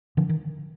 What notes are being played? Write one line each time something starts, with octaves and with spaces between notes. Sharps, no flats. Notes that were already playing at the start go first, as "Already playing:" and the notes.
D3 F3
D#3